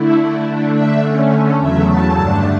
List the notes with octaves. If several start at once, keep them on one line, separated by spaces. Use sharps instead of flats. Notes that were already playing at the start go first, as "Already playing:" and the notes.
Already playing: D3 A3 E4
D3 A3 D4
E5
D3 A3 C#4
E2 C#3 F#3 A3 E5
A5
G2 D3 A3 D4